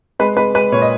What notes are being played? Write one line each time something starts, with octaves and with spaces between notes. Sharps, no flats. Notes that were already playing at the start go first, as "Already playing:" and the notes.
G#3 B4 B5
G#3 B4 B5
G#3 B4 B5
A#2 C#5
D#5